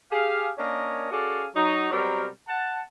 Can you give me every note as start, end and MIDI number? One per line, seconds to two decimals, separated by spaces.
0.12 0.50 67
0.12 0.50 68
0.12 0.50 77
0.58 1.10 58
0.58 1.10 61
0.58 1.10 62
0.58 1.10 70
0.58 1.10 73
0.58 1.10 75
1.11 1.45 61
1.11 1.45 66
1.11 1.45 68
1.11 1.45 69
1.11 1.45 74
1.11 1.45 77
1.55 1.90 54
1.55 1.90 63
1.91 2.27 47
1.91 2.27 54
1.91 2.27 55
1.91 2.27 60
1.91 2.27 70
2.48 2.80 78
2.48 2.80 81